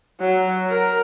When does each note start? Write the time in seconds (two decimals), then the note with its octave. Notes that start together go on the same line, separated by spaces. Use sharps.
0.21 F#3
0.69 A#4